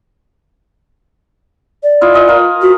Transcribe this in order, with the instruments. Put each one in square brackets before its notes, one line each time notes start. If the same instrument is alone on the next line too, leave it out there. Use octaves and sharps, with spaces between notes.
[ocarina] D5
[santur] E4 F4 D#5
B4 D#5 G#5
F4 A#4
[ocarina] F#4